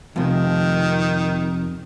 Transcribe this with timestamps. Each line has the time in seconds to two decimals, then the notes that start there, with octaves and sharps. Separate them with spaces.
0.16 F2 C3 D#3